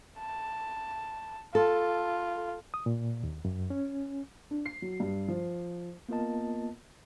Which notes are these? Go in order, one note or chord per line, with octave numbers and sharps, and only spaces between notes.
A5
F4 A4
D#6
A#2
D#2
F#2
C#4
D4
C7
F#3
G2
F3
A#3 B3 F4 A#4 D#5 A5